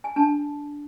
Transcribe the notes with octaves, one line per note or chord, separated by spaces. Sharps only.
G#5
D4 A5